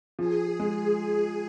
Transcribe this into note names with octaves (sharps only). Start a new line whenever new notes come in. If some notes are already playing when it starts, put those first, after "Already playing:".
F3 G#4
G#3